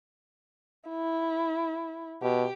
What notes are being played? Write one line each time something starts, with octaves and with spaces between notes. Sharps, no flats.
E4
B2 G4